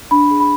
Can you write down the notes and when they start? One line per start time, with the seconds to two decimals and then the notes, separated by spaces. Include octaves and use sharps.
0.11 D4 B5
0.30 G#4
0.40 B5